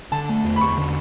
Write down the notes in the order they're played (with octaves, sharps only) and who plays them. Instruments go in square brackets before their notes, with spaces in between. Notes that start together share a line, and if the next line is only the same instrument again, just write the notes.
[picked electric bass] D3 [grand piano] A5
[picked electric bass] A3
E2
[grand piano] B5
[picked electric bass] E2 [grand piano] C#6
[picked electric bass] D3